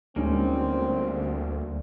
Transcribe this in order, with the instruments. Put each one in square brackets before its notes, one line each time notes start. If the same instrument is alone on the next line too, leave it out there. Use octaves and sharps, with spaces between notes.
[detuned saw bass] D2 [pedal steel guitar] G3 A#3 [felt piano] G#3 C#4 D#4 [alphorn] C4